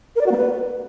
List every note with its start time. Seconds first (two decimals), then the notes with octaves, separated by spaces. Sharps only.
0.16 A#4
0.21 D5
0.26 F#4
0.31 A#3
0.37 B4